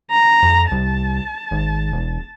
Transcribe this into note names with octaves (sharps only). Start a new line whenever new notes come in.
A#5
F2
C2 A5
G#1
E1